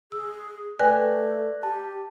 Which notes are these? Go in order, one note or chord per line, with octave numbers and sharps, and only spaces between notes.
G#4 E6
A3 B4 D5 G5 G#5 F#6 A#6
G4 A5